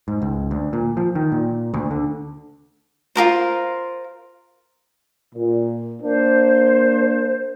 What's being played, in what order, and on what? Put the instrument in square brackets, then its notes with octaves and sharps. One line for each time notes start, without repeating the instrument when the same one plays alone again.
[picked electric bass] G#2
C#2
D2
A#2
F3
D#3
A#2
D2
D3
[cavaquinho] F4 G4 A#4 C5
[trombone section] A#2
[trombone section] A#3 D4 [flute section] C5